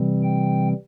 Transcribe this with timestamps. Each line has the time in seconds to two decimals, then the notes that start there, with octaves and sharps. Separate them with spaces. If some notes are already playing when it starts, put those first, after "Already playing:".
Already playing: C3 E3 G3 C4
0.23 G5